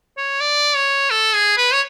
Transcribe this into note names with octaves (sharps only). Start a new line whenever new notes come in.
C#5
D5
C#5
A4
G#4
B4
C#5